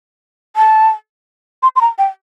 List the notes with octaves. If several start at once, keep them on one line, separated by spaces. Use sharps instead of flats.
A5
C6
C6
A#5
G5